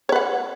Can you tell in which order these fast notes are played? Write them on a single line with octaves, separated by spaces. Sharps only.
C#5 B4 F#5